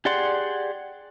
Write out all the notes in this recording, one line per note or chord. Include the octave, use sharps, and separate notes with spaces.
G4 G#4 D5 F#5 C6